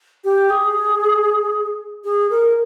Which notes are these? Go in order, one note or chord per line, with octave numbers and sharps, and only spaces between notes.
G4
G#4
G#4
A#4